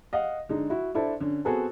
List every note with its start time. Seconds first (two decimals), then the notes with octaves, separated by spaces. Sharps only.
0.13 D#5 F5 F#5
0.49 D3 G#3 D#4
0.70 E4 F#4
0.95 D4 E4 A4 C5
1.20 D3 C#4
1.45 B3 C4 F#4 G#4 A4 B4